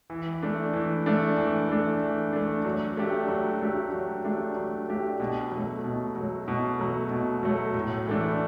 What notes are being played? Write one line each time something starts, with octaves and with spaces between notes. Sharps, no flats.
E3
A3 D4
E3
A3 D4
E3
A3 D4
E3
A3 D4
F#3
A3 D4 G4
F#3
A3 D4 G4
F#3
A3 D4 G4
F#3
A3 D4 G4
B2
F#3
A3
B2
F#3 A3
B2
F#3 A3
B2
F#3 A3
A2
E3 A3 D4